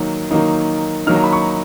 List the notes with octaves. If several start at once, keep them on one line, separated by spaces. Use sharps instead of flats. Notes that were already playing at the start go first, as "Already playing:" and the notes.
Already playing: D#3 F#3 A#3 D#4
D#3 F#3 A#3 D#4
D#3 F#3 A#3 D#4 F6
A#5
B5
C#6